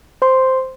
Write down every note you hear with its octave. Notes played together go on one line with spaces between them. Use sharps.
C5 C6